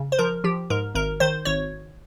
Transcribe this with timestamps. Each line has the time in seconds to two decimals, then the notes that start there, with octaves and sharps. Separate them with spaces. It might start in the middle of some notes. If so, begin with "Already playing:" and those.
Already playing: C#3
0.12 C5
0.19 F3 A#4
0.44 F3 G4
0.70 G#2 A#4
0.95 G#1 A#4
1.20 D#3 C5
1.45 G#1 C#5